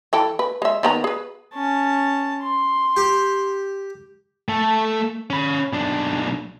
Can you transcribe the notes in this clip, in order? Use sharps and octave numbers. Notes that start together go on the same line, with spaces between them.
E3 A4 G5
B4
G#3 E5
D#3 B3 A#5
G#4 B4
C#4 A5
C6
G4
A3 A4
C#4 B5
B1 D4